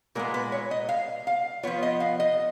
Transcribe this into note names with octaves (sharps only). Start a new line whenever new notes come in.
A#2 G#3 B3 A#4
B4
C#5
D#5
F5
F5
F3 B3 F4 C#5
D#5
F5
D#5